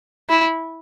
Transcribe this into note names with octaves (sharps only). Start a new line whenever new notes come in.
E4